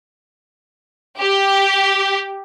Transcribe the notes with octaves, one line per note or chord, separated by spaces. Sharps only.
G4